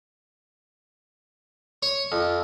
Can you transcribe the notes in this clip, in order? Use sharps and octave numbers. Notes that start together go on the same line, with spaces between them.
C#5
F2